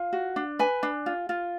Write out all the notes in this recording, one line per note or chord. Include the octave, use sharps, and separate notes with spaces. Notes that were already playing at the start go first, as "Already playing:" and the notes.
Already playing: F4 F5
F#4
D4
B4 G#5
D4
F4
F4